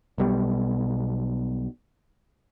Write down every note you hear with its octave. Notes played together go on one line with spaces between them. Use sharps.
B1 B2 G3